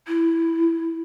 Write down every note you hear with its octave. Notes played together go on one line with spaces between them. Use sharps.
E4